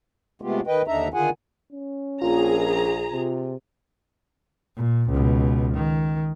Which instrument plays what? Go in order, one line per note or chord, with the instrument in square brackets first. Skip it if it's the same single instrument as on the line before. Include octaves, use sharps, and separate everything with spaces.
[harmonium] C3 G#3 A3 B3 F4 G4
D#3 B4 D#5 G5
D#2 D3 D4 D#4 E5 A#5
D3 D#3 F4 G#4 F#5 G#5
[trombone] C#4
[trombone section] A#1 [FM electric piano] F4 [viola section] G#4 A#5
[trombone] C3
[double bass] A#2
C#2 B2
D#3